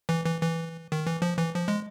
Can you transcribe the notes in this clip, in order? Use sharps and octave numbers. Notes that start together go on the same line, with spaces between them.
E3
E3
E3
D#3
E3
F3
E3
F3
G#3